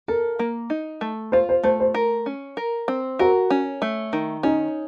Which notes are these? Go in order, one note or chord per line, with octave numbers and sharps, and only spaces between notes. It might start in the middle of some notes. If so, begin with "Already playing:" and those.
A4 A#4
A#3
D#4
A3
F4 C5
C5
A3 C5
C5
A#4
C#4
A#4
C4
F#4 A#4
C#4
A3
D#3
C#4 D#4